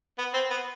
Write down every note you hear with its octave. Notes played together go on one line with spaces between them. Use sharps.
B3
C4
B3